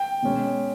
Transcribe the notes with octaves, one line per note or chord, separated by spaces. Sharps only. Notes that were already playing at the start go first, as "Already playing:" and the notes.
Already playing: G5
B2 G#3 C#4